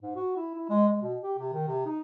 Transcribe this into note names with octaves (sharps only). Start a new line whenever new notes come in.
G#2
F#4
E4
E4
G#3
G#3
B2
G4
C3
D#3
C3
D#4